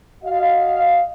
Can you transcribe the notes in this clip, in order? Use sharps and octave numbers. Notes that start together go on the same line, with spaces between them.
F#4 D#5 F5